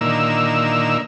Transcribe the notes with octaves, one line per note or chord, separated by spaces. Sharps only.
A#2 D3 D#3 A#3 E4 E6